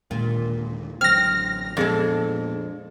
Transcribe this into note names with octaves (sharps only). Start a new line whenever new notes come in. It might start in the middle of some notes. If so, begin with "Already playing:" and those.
D#2 A#2 D3 G#3
A1 D3 F#3 C4 F6 A#6
F2 A#2 G#3 B3 D4 G#4 A4